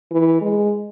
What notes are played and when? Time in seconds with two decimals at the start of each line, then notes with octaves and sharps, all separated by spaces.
0.11 E3
0.42 G#3